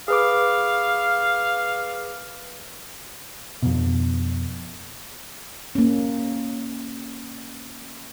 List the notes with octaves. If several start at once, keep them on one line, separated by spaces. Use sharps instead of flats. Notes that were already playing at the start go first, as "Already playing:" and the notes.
G#4 B4 F5 D6
F2 B2
A#3 C#4